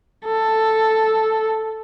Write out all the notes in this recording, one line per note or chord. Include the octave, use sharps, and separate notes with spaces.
A4